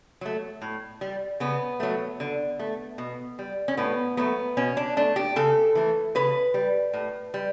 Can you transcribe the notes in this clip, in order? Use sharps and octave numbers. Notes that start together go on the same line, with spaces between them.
F#3 A3
A2
G3
C#3 B3
F#3 A3
D3
A3
B2
G3
C#4
A2 B3
F#3 A3 B3
B2 C#4
D4
A3 D4
G4
C#3 A4
E3 A3
C#3 B4
G3
A2
G3